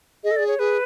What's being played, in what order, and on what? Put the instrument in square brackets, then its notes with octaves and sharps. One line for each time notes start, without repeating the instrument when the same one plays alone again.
[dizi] G#4 [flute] D#5
[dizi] A4
[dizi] G#4 [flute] D5
[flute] C#5
[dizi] G#4 [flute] B4